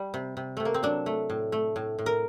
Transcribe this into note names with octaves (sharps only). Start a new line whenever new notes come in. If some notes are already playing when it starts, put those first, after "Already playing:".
Already playing: G3
C3
C3
C3 A3
A#3
C4
F#3 D4
A3
A2
A3
A2
A2
A#4